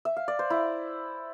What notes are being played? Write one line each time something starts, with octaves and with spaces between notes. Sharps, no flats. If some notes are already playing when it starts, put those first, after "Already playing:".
E5
F5
D5
C5
E4